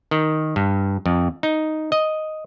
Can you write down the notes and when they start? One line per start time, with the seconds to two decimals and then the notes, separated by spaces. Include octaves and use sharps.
0.11 D#3
0.56 G2
1.06 F2
1.43 D#4
1.92 D#5